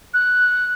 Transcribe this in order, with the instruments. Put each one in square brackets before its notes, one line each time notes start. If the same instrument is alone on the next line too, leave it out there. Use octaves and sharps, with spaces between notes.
[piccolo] F#6